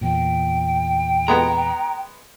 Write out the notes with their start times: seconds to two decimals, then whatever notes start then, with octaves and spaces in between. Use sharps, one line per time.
0.01 E2 A#2 G5
1.28 G#3 B3 A#5